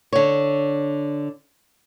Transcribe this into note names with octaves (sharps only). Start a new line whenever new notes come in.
D3 C#5